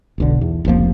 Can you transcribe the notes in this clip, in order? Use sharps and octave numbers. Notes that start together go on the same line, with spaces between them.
E1 B1 D3
E2
F1 C#2 F3 A#3